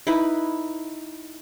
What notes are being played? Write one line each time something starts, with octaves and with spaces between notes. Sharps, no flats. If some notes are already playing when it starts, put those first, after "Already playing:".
D#4 E4 B4